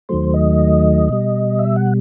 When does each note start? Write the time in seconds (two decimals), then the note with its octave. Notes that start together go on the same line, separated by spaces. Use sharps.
0.09 D#2 D#3 F#3 A3 C5
0.34 D#5
1.09 B2 G3
1.59 E5
1.76 F#5